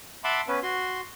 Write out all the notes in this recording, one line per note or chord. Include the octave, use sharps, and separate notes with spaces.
E5 F#5 A5 B5 C6 D6
B3 C#4 B4
F#4 C6